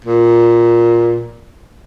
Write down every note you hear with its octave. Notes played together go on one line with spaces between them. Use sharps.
A#2